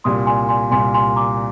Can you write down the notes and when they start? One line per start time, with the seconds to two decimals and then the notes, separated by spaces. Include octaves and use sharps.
0.04 C2 A#2 G3 C6 D#6
0.26 G#5 C6
0.49 G#5 C6
0.71 C2 A#2 G3 G#5 C6
0.94 G#5 C6
1.16 A#5 D6